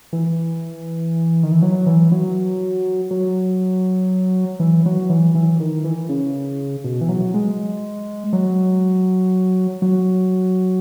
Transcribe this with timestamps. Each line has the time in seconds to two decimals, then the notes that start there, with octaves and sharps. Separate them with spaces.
0.13 E3
1.43 D#3
1.52 E3
1.62 F#3
1.86 E3
2.12 F#3
3.11 F#3
4.60 E3
4.86 F#3
5.10 E3
5.35 E3
5.60 D#3
5.84 E3
6.09 C#3
6.84 B2
7.01 E3
7.09 F#3
7.34 G#3
8.33 F#3
9.82 F#3